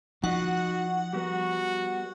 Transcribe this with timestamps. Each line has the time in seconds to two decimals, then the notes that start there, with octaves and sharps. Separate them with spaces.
0.24 F3 D#4 F#4 D#5 F#5
1.13 G3 B3 F#4 A#4